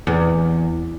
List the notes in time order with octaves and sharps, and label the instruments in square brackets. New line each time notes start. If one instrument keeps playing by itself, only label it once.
[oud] E2